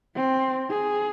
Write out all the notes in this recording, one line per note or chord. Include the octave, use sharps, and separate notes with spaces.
C4
G#4